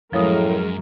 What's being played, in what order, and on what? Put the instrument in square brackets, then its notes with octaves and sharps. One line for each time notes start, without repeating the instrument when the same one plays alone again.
[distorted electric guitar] F#2 [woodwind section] A2 [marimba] F3 D#6 [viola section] G#3 A#4